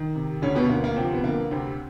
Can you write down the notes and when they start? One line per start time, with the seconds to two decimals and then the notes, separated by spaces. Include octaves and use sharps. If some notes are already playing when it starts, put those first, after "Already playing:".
Already playing: D#3
0.15 C3
0.42 D2 C#3 C#4
0.55 B2 B3
0.69 D2 A#3
0.84 A#3
0.96 C3 F3 C4
1.13 B3
1.24 D3 A#3
1.51 D2 C3 C4